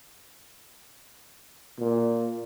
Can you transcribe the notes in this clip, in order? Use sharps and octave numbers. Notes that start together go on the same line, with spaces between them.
A#2